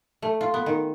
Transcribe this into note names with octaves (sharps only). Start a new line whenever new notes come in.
A3
F4
B3
D#3